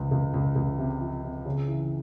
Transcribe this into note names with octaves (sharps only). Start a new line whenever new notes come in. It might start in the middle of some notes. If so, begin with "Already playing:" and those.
Already playing: C#2 F3
C#2
C#2
C#2
C3
F3
C3
C#3
E3